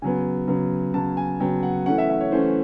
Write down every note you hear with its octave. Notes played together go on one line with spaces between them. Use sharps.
C#3 F#3 B3 G#5
C#3 F#3 B3
C#3 F#3 B3 A5
G#5
C#3 F#3 B3 G5
F#5
E3 A3 C#4 F#5
E5
E5
C#5
E3 A3 C#4 C5